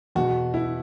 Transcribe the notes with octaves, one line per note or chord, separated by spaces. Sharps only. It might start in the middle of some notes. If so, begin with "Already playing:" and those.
E2 B2 F#4
E4